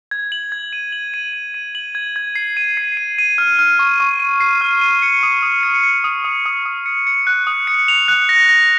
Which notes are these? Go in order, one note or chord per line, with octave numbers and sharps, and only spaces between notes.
G#6
F#7
G#6
D#7
F#7
D#7
D#7
D#7
F#7
G#6
G#6
C7
D#7
C7
D#7
D#7
F6
F6
C#6
C#6
D#7
C7
F6
D#7
C#7
D#6
D#6
C#7
C#7
D#6
D#6
D#6
D#6
C#7
C#7
F#6
D#6
C#7
F7
F#6
A#6
A#6